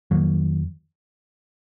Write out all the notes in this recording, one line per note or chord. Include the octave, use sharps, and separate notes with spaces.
F2 D#3 F#3 A#3